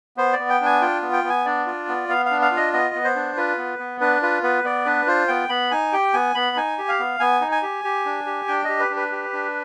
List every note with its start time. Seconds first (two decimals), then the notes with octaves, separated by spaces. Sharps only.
0.17 B3 C5
0.33 D5
0.39 B3
0.50 G5
0.61 D4 G#5
0.81 F4 G5
1.02 B3
1.13 G5
1.24 B3
1.29 G#5
1.45 D4 D5
1.66 F4
1.88 B3
2.09 B3 F5
2.26 F5
2.31 D4
2.41 F5
2.51 F4
2.56 D#5
2.73 B3 D#5
2.95 B3
3.04 C5
3.15 D4
3.37 F4 B4
3.58 B3
3.79 B3
4.01 D4 B4
4.22 F4 B4
4.43 B3 B4
4.64 B3 D5
4.85 D4 B4
5.07 F4 C5
5.28 B3 G5
5.49 B3 B5
5.71 D#4 G#5
5.93 G4 G5
6.13 B3 G#5
6.35 B3 B5
6.56 D#4 G#5
6.78 G4
6.88 F5
7.00 B3
7.20 B3 G#5
7.41 D#4
7.52 G#5
7.63 G4
7.84 G4
8.06 D4
8.26 G4
8.48 D4 G5
8.64 G4 D#5
8.79 B4
8.90 D4
8.96 B4
9.12 G4
9.33 D4